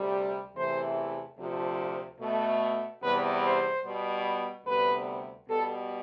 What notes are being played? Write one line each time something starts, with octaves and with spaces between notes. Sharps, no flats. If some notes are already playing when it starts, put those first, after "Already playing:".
Already playing: D2 C3 G3
E2 C3 E3 A3 C5
D2 C3 F3
B2 A3
E2 C3 G3 B3 B4
C5
B2 G3 B3
D2 C3 G3 B3 B4
B2 G3 B3 A4